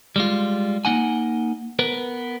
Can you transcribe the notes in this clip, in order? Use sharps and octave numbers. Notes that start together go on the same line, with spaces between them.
G3 G#3 F4
A#3 D#4 F#5 G#5
B3 A#4 B4